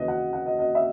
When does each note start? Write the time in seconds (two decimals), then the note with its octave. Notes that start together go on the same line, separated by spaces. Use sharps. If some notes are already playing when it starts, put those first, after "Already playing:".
Already playing: D#2 C#3 E3 B4 D#5
0.08 F#5
0.33 F#5
0.46 D#5
0.59 D#5
0.75 E5